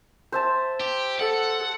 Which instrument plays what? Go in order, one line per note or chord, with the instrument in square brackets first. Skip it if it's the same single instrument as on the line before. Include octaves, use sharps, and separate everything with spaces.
[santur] C5 E5 A5
[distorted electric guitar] G4
[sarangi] A4 [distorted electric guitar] F#5